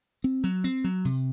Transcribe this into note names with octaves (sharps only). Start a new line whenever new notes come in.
C4
F#3
C4
F#3
C3